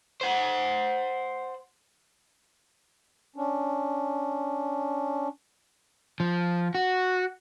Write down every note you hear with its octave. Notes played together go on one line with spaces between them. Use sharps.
C5 F#5
C#4 D4
F3
F#4